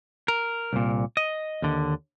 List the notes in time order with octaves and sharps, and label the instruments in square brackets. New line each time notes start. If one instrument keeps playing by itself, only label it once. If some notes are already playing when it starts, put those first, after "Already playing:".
[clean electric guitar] A#4
C2 A#2
D#5
D#2 D3